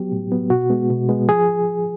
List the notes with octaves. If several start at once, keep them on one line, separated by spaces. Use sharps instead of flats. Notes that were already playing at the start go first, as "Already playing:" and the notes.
Already playing: F#3 B3 G4
A2
F#3 B3
B2 F#4
G#3 B3
B2
G#3 B3
F3 G#4